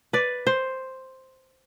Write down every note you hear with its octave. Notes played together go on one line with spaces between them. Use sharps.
B4 D5
C5